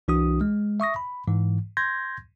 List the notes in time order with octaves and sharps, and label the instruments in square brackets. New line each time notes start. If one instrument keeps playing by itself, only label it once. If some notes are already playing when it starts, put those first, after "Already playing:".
[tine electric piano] C2 E3 D4 F#4 D#6
G#3
E5 C#6 D#6 A#6
B5
G#2 E3
C6 G6 G#6 A#6